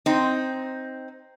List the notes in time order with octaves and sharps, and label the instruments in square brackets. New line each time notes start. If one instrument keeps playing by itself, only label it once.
[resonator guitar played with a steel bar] C4 D#4